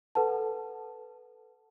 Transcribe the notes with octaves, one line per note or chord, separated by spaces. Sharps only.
A4 B4 F#5 A5